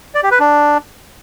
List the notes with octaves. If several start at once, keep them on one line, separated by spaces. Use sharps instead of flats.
D5
G4
B4
D4